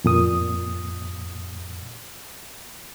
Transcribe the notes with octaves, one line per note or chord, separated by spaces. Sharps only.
F2 A#2 D#6